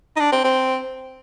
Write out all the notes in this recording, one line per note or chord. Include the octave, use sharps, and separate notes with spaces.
D#4
D4
C4
C4